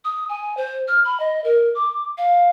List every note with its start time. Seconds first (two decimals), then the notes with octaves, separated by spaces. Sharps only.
0.05 D#6
0.29 G#5
0.57 C5
0.88 F6
1.05 B5
1.20 D#5
1.44 A#4
1.75 D6
2.18 F5